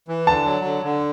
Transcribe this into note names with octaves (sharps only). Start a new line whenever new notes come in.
E3
D3 A5
F#3
D3
D3